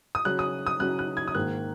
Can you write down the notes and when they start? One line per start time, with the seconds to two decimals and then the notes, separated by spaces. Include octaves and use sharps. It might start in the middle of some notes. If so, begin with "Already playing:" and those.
0.15 D#6
0.25 C#3 F#3 C#4 F#6
0.39 D#6
0.67 D#6
0.80 C#3 F#3 C#4 F#6
0.99 F#6
1.17 G#6
1.28 D#6
1.35 G#2 D#3 A#3 F#6